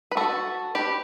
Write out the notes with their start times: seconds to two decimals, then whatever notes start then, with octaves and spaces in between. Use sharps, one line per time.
0.11 B4
0.17 F#4 A4
0.75 G4 B4